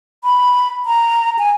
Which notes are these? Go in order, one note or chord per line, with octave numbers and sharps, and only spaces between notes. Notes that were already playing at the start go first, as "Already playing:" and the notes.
B5
A#5
G#5